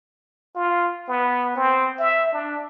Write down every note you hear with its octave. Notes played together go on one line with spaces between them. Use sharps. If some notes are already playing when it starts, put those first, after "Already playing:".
F4
B3
C4
E5
D4